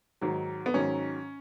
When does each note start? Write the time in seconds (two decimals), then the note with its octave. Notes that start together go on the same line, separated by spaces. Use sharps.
0.21 G#2 D#3 F#3
0.66 B3
0.74 G#2 D#3 F#3 C#4